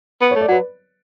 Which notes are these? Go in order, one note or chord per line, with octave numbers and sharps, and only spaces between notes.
B3
C#5
A3
D5
F#3 B4